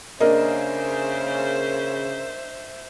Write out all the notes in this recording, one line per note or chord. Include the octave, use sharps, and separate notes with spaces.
C#3 A#3 D4 A#4 C5 D#5 E5